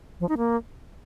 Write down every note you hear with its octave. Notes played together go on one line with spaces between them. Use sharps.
F3
D#4
A#3